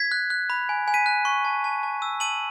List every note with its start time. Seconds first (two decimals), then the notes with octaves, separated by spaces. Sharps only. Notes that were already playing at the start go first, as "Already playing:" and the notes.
Already playing: G#6 B6
0.12 F#6
0.30 F#6
0.50 B5
0.69 G#5
0.88 G#5
0.94 B6 D#7
1.06 F#6
1.25 C#6
1.45 A5
1.64 A5
1.83 A5
2.02 E6
2.20 A5 D#7 F#7